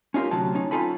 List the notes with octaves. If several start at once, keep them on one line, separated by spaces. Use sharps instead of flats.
C#4 D#4 F4 G4 A#4
D2 C3 F#3 A5
C#4 D#4
C4 D#4 F4 A4 G#5 B5